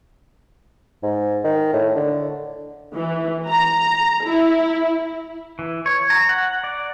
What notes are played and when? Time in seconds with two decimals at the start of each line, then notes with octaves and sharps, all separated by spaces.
1.03 G#2
1.44 D#3
1.73 A2
1.95 D3
2.95 E3
3.48 A#5
4.26 E4
5.59 E3
5.86 C#5
6.10 A#5
6.29 F#5
6.64 D5